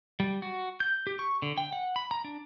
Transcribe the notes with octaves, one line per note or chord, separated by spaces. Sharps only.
G3
F#4
G6
G4
C#6
D3
G5
F#5
B5
A#5
D4